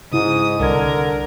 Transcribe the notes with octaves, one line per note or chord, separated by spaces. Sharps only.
G#2 C#3 E4 D#6
C2 D3 A#4 G#6